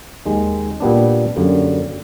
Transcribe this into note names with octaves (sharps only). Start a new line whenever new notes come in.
D#2 D#3 G#3
A#2 G3 B3 D4
F#2 D3 G3 A#3